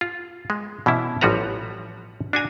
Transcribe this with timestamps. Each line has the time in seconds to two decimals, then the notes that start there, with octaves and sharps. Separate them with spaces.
0.01 F4
0.50 G#3
0.86 B2 E3 C#4 E4
1.21 A1 F3 G3 F#4 B4 A#5
2.33 D4 F#4 G#5 A#5